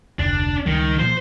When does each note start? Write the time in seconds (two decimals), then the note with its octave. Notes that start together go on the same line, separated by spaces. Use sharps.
0.19 F1 D2 D4
0.66 C#2 D#3 G3
0.99 A#2 F3 C5